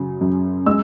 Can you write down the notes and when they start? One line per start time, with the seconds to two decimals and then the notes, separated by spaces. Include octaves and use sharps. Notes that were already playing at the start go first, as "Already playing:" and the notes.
Already playing: F#2 C#3 F#3
0.21 F#2
0.66 G#3 E6